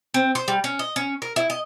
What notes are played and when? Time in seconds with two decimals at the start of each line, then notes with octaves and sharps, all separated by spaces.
0.14 C4
0.35 C5
0.48 G3
0.64 C#4
0.79 D#5
0.96 C#4
1.22 A#4
1.36 E4
1.50 D#5